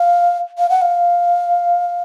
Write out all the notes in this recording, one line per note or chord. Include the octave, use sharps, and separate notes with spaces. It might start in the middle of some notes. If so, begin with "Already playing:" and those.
Already playing: F5
F5
F#5
F5